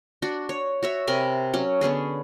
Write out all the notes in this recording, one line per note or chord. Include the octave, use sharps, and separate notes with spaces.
D4 F#4
C#5
F#4 C#5 E5
C3 A#4 G#5 B5
F#3 C#4
D3 B3 C#4 G#4